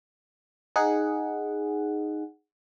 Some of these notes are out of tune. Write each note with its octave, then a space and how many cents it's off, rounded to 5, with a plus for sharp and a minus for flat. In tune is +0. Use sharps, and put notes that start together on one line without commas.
D#4 -5 G#4 +0 F#5 +0